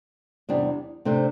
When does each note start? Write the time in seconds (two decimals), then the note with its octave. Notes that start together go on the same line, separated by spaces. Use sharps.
0.49 E2 C3 G3 D4
1.05 C3 A3 D4 C5